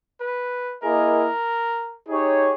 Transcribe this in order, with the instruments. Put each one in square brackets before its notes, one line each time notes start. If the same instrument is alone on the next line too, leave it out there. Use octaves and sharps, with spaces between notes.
[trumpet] B4
[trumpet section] A#3 E4 G#4 D#5 [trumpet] A#4
[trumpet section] D#4 G4 C#5 [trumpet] G#4